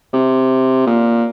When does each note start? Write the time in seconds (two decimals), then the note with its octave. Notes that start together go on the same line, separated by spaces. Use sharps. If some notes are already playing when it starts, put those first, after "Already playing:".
0.13 C3
0.87 A#2